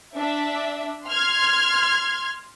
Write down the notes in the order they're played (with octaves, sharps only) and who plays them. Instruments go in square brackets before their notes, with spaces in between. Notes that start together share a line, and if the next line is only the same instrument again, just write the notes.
[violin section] D4 E5
C6 F6 G#6